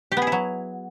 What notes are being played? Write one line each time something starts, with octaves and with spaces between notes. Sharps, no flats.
G4
B3
G#4
E4
F#3